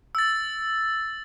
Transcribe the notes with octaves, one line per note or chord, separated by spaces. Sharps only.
E6 A6